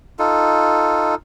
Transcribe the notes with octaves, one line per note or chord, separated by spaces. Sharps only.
D#4 F4 A4